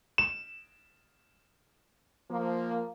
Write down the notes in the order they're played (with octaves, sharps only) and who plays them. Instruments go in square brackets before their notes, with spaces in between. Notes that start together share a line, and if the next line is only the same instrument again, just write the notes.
[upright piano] E7
[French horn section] F3 A#3